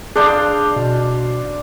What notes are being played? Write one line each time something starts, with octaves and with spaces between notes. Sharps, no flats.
D4 G#4 C5 F5
B2